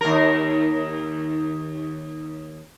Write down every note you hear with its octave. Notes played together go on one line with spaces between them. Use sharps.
D#2 A#4